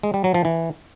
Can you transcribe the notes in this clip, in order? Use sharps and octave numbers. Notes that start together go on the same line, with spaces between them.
G#3
G3
F#3
F3
E3